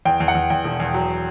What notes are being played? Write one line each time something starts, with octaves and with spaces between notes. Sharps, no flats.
E2 G5
E2
F#5
E2
E2 G5
E1
E2
F#3